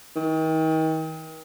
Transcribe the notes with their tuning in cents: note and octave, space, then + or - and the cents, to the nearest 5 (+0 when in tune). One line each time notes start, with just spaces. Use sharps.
D#3 +40